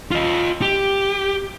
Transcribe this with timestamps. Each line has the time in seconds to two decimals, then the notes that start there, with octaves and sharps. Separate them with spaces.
0.11 F4 D#5
0.62 G4